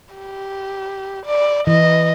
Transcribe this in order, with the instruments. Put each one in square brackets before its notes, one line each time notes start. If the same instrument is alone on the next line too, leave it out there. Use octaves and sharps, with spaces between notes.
[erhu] G4
D5
[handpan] E3 [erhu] D#5